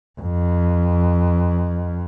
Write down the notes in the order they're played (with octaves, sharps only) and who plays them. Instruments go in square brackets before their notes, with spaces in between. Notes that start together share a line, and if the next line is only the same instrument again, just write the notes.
[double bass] F2